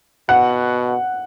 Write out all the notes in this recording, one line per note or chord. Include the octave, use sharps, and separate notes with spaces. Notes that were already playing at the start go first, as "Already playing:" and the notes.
B2 F#5